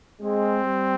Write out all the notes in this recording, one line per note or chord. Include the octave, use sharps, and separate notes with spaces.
G#3 C4
G3